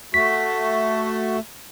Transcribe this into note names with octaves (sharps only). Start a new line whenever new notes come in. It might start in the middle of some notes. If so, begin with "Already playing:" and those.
A3 F#4 B6